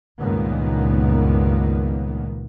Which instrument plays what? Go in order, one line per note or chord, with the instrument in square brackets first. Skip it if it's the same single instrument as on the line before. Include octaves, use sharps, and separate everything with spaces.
[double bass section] C#2 G2 A#2 D#3 A#3 B3